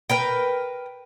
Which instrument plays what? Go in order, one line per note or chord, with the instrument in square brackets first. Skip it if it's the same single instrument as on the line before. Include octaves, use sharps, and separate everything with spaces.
[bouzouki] A#4 B4 G5